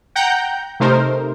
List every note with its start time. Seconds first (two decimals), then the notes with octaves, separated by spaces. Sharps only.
0.15 F#5 G5 A#5 G6
0.80 C3 A3 D#4 A#4 C5